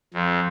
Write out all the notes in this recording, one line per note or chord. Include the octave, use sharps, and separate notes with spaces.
F2